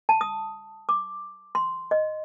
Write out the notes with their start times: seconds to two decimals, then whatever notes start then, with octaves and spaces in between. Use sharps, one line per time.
0.09 A5
0.21 D#6
0.89 D6
1.55 C6
1.91 D#5